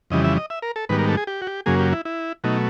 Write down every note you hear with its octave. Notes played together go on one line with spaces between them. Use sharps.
F2 C#3 E3 G3 D#5
E5
D#5
E5
A#4
A4
G#2 D#3 G3 B3 B4
A#4
A4
G#4
G4
F#4
G4
F#2 C#3 F#3 A#3 G#4
G4
E4
E4
B2 F#3 A3 D#4